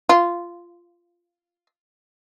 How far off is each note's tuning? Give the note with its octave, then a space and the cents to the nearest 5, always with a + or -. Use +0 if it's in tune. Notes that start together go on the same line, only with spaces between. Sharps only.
F4 -10